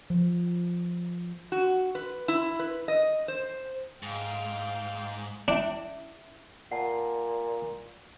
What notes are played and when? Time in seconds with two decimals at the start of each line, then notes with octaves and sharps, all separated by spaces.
0.10 F3
1.52 F#4
1.95 B4
2.28 E4
2.59 B4
2.88 D#5
3.28 C5
4.03 G#2 F5 G5
5.48 C#4 D4 E4 E5
6.71 A#2 F#5 A5